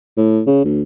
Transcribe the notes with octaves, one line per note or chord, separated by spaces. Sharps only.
A2
C#3
D2